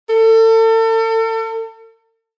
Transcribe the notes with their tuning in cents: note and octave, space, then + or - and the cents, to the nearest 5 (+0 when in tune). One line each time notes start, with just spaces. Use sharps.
A4 +35